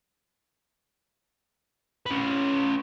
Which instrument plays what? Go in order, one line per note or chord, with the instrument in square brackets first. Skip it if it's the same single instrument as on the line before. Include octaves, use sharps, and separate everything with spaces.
[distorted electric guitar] C#4 B4